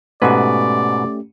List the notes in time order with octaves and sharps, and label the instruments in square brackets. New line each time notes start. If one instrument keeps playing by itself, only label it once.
[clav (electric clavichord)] G#2 B2 B4 [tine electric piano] A3 C#4 G4 [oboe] D5